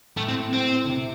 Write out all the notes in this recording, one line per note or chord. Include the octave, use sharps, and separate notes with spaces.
A2 A3
C4
C4
D3
C3